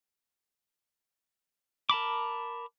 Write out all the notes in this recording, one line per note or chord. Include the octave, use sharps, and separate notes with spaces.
A#4 A5 B5 D6